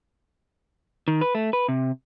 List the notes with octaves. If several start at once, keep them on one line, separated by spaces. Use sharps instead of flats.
D#3
B4
A3
B4
C3